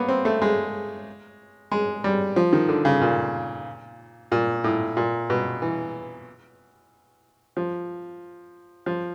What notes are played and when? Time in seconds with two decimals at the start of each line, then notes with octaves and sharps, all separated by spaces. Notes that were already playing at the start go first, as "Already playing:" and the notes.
Already playing: A#3 B3
0.08 C4
0.25 A3
0.42 G#3
1.72 G#3
2.04 G3
2.36 F3
2.53 D#3
2.69 D3
2.85 C#3
3.01 A#2
4.32 A#2
4.64 A2
4.97 A#2
5.30 B2
5.62 E3
7.57 F3
8.86 F3